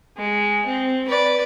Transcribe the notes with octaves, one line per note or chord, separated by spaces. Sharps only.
G#3
C4
B4 D5